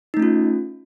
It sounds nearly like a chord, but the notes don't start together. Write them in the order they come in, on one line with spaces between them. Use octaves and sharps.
D#4 A3 C#4 F4